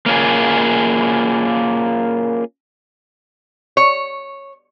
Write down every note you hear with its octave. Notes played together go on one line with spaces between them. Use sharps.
A#3 C#4 F4 G#4
C#5